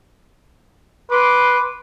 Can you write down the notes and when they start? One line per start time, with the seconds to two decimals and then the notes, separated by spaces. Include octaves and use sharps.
1.10 B4 C6 D6